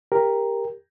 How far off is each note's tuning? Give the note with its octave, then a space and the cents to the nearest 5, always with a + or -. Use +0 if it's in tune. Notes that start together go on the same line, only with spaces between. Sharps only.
G4 +20 A#4 +0